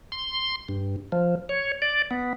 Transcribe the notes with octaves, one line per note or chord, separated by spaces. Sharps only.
C6
G2
F3
C#5
D5
B3